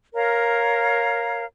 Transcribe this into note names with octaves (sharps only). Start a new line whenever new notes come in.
A#4 C#5 F5 A#5